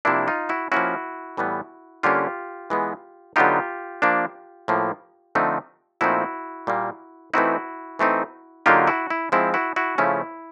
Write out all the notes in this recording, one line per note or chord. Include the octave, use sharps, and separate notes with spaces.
C3 F3 A#3 D4 E4
D#4 F4
E4 F#4
F3 A#3 C#4 E4 F#4
A2 E3 G3 B3
D3 G3 A#3 C#4 F4 G4
E3 G#3 B3
D3 F#3 B3 D#4 F4 G4
F3 A#3 D4
A2 F3 A#3
D3 F3 A3 C4 D#4
A#2 F3 A3 C4 D#4 E4 F#4
A#2 G3 A#3
E3 A3 C4 D#4 E4 F#4
E3 A3 C4 D#4
D3 F#3 A#3 D#4 F4 G4
E4 F#4
E4
F3 G#3 C4 E4
E4 F#4
E4 F#4
C#3 F3 A3 C#4 E4